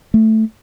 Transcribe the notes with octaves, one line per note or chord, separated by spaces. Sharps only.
A3